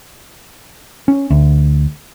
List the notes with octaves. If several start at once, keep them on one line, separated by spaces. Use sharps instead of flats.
C#4
D2